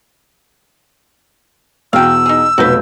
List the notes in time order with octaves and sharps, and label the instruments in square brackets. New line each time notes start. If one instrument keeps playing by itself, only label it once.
[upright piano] E2 B2 [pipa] F5 G5 [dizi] E6
[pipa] D#4 G#4
[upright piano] F1 B1 G6 [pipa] F#4 B4